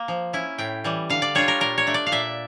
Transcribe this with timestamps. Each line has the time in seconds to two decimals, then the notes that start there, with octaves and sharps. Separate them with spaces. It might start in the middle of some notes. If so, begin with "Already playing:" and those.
Already playing: A#3
0.08 F3
0.33 C#4 E4
0.58 A2 G5
0.84 E3 G3
1.10 D3 F5
1.22 D5
1.35 G3 D4 F4 C#5
1.48 A#4
1.60 A#2 A#4
1.78 C#5
1.87 A3 D4
1.94 D5
2.06 F5
2.12 A#2 E5